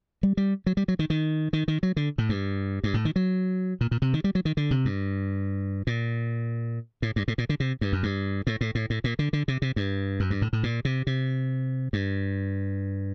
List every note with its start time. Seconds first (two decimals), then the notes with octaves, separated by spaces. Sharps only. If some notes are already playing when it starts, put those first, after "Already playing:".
0.23 G3
0.37 G3
0.66 F#3
0.77 G3
0.88 F#3
0.99 D#3
1.10 D#3
1.53 D#3
1.68 D#3
1.83 F#3
1.97 D3
2.18 A2
2.29 G2
2.84 G2
2.94 A2
3.05 D#3
3.16 F#3
3.81 A#2
3.91 A#2
4.02 C3
4.14 D#3
4.24 G3
4.35 F#3
4.45 D#3
4.57 D3
4.71 C3
4.85 G2
5.87 A#2
7.02 A2
7.16 G2
7.28 A2
7.38 A#2
7.49 D3
7.60 C3
7.81 G2
7.93 F#2
8.03 G2
8.47 A2
8.61 A2
8.75 A2
8.90 A2
9.04 A#2
9.19 D3
9.33 D3
9.48 C3
9.62 C3
9.76 G2
10.20 F#2
10.30 G2
10.42 A2
10.53 A2
10.63 A#2
10.85 C3
11.07 C3
11.93 G2